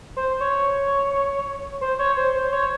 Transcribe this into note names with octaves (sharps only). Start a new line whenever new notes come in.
C5
C#5
C5
C#5
C5
C5
C#5